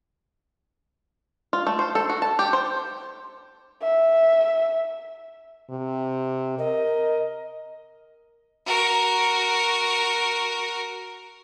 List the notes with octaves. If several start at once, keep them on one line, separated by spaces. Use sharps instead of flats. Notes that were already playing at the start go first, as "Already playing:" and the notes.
F4
A3
C5
A4
F#4
A5
G4
C5
E5
C3
A#4 D#5
F#4 A#4